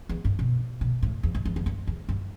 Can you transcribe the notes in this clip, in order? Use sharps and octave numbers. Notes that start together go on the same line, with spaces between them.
E2
G2
B2
B2
A2
E2
G2
E2
E2
G2
E2
G2